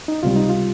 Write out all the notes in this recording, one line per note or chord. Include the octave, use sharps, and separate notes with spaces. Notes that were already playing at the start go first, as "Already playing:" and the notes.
D#4
C#2 C3 G3 F4
D#4
F4